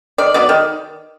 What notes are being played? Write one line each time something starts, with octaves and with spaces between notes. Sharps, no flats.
D#3 D5
F#3 B3 D5
D#3